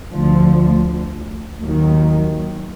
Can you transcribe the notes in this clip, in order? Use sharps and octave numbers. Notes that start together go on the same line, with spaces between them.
D2 D3 F3
D#2 D#3 F#3